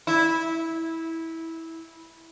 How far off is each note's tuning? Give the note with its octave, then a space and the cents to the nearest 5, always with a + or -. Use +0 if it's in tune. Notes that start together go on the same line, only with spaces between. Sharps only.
E4 -15